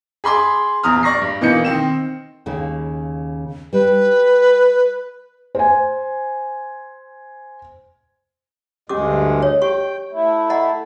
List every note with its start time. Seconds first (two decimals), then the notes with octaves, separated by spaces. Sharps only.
0.24 G#4 B5 C6 D6
0.83 A#1 E2 A#5 D#6 F6
1.03 D5 C#6 A#6 C7
1.22 G2
1.41 B2 E3 A#3 D#4 G6 C#7
1.65 D#3 C4 E7
2.46 D#2 C#3 A#3
3.73 G3 B4
5.55 C5 G#5
8.89 D2 G2 G#3 C#4 G4 D6
9.42 C#5
9.62 G4 G5 C#6
10.12 A3 E4
10.50 D#5 F#5 A#5